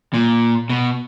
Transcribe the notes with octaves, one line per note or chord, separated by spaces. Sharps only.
A#2
B2